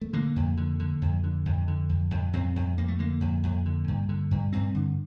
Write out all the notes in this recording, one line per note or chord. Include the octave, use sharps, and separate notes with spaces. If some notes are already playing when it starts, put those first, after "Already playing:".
A3
D3 A#3
F2
D3
D3
F2
D3
F2
D3
F2
F2
F2 C4
F2
F2 A#3
A3
D3 A#3
F2
F2
D3
G2
D3
G2
G2 C4
D3